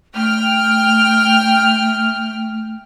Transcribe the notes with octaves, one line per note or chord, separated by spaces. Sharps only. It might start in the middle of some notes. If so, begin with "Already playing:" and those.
A3 G5 F6